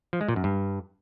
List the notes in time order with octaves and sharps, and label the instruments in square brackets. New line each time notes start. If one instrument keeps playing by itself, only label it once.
[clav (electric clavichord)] F3
G#3
A#2
F#2
G2